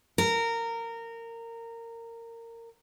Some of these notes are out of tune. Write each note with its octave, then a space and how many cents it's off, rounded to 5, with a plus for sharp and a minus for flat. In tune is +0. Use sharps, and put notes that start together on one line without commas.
A#4 -20